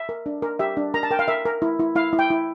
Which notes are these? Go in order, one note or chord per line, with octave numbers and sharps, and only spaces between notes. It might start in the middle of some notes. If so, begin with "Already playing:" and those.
Already playing: E5
A#4
D4
A#4
G4 E5
D4
A#4 A#5
A5
A#4 G5
F5
A#4 E5
A#4
E4
E4
E4 F5
E4
G5
E4